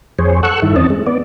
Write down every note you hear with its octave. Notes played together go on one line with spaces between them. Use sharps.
F2 G#4 C5 C#5
A4 F#5 C#6 E6 F#6
G2 D#3 E4 A4
E2 C4 C#4 D#5 A5
G#3
B3 D5